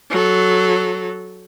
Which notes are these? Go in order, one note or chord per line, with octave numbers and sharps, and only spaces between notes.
F#3 A4